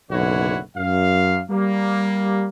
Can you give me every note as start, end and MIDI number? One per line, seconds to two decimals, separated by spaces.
0.11 0.59 30
0.11 0.59 35
0.11 0.59 50
0.11 0.59 64
0.11 0.59 66
0.11 0.59 73
0.76 1.40 42
0.76 1.40 77
1.50 2.47 55
1.50 2.47 58